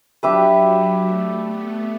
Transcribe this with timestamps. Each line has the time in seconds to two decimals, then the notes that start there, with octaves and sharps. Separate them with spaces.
0.23 F#3 D4 G4 B4 E5
1.04 A3
1.45 B3